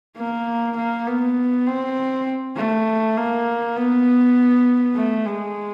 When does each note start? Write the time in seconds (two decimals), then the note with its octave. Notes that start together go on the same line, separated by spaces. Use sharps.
0.17 A#3
0.76 A#3
1.07 B3
1.67 C4
2.56 A3
3.17 A#3
3.76 B3
4.96 A3
5.26 G#3